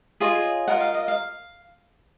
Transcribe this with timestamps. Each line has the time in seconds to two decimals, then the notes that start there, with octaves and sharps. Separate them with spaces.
0.20 F4 G#4 C#5 D#5
0.68 F4 A#4 D#5 F#5
0.80 F5
0.94 D#5
1.08 F5